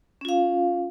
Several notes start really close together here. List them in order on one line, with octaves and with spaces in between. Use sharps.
C#4 F4 F5